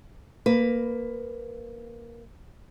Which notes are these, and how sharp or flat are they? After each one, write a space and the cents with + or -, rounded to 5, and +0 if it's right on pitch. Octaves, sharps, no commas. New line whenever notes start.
A#3 +0 B4 +15